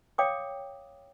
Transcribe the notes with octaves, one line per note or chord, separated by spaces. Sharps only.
C#5 F5 G5 D6 D#6